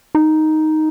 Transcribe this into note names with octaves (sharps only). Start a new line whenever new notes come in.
D#4